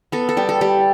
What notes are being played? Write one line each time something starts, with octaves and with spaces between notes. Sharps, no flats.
B3 A4
A4
G3 G4
A4
G3 G4